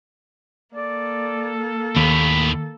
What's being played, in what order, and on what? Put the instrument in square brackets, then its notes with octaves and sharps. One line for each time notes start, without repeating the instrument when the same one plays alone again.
[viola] A#3 A4 [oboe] D5
[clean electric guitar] D#2 [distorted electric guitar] A2 D#3 [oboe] B5